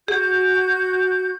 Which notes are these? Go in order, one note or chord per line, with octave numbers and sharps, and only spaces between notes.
F#4 G#4 G6